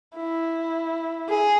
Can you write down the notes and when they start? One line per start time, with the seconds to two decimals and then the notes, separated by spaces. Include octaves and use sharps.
0.17 E4
1.29 G#4